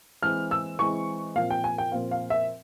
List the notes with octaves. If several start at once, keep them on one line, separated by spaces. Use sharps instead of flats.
E3 G#3 C4 F6
E6
E3 G#3 C4 C#6
A#2 F3 C4 F5
G5
G#5
G5
A#2 F3 C4 F5
F5
E5